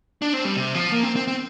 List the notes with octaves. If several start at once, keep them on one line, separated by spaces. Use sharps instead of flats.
D4
C4
G3
C3
F3
A#3
C4
C4
C4